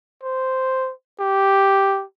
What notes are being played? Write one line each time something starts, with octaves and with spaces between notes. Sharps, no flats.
C5
G4